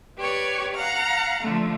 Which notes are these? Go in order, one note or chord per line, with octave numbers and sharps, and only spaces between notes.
G4 B4 C#5 D5 C#6
F5 F#5 A#5 F6
D3 F3 A3